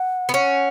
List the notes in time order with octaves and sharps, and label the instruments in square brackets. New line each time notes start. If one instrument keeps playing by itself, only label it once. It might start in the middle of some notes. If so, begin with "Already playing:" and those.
Already playing: [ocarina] F#5
[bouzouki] B3
[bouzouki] C#4 [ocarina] F#5